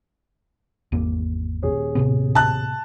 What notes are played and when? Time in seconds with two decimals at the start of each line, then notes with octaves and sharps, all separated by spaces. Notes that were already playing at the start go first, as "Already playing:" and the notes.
0.92 G#1 E2 A#3
1.63 D#1 G#4 C#5
1.95 A2 C3 B3
2.35 A5 F#6